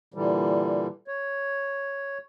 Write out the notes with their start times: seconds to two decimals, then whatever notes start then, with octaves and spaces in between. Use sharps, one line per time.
0.14 A#2 D3 E3 G3
1.08 C#5